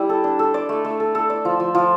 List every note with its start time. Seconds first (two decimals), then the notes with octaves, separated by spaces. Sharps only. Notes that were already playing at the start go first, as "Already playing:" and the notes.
Already playing: G3 E4
0.09 A4
0.24 D4
0.39 A4
0.54 D5
0.69 A3
0.85 A3
1.00 A4
1.15 A4
1.30 D5
1.45 F3
1.60 F3
1.75 F3